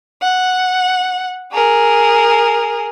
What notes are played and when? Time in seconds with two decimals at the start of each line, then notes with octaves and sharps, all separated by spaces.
0.22 F#5
1.52 G#4 A#4